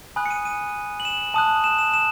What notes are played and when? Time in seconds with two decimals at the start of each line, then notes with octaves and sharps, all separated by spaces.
0.16 G#5 B5 D#6 F#6
0.26 C#7
0.31 D#7
0.45 D#7
1.00 F#7
1.05 E7
1.34 A5 D#6 F#6
1.64 E7
1.78 E7
1.94 E7